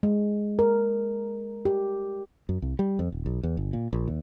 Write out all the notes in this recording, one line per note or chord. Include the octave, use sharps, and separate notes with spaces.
G#3
A#4
G4
F#2
C2
G3
F2
D#1
B1
E2
G1
A#2
A#1
D#2